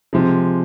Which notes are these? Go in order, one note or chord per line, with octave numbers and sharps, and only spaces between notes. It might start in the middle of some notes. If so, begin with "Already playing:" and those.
C3 F3 G#3